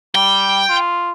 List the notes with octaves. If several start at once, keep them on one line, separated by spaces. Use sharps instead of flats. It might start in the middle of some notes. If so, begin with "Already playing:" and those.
G3 G5
F4